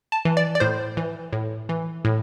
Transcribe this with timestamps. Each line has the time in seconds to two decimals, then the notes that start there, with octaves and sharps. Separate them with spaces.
0.12 A5
0.25 E3
0.37 D5
0.55 D5
0.60 A2 C5
0.97 E3
1.33 A2
1.69 E3
2.05 A2